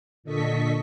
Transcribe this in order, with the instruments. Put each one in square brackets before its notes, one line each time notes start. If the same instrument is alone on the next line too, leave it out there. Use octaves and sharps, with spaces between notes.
[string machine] A#2 D3 A4 D#5 C#6 B6